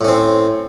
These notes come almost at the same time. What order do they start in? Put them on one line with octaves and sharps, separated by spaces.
A2 C#4 C4